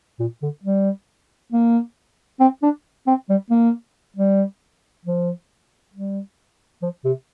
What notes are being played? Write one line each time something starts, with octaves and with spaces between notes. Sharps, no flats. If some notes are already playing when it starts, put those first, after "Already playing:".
A#2
D3
G3
A#3
C4
D4
C4
G3
A#3
G3
F3
G3
F3
C3